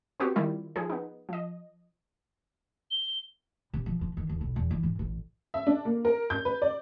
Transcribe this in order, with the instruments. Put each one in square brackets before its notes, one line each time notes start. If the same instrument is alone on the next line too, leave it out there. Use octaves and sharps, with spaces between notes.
[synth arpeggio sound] B3 C4 F#4 G4 C5 C#6
D#3 G3 E4 F4
F3 D#4 G#4
B3 D#4
F3 D#5
[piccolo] G7
[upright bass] C3
F3
F3
D#3
D#2
B1
E2
E3
G#2
A1
[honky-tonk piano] E5
D4
A#3
A#4
G6
B4
D5